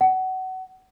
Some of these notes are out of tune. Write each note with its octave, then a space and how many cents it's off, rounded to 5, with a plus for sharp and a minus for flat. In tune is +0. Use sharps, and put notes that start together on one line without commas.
F#5 +25